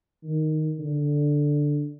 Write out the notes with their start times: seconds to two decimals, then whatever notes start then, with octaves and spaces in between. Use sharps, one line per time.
0.23 D#3
0.79 D3